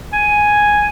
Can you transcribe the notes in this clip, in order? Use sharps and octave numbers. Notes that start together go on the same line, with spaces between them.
G#5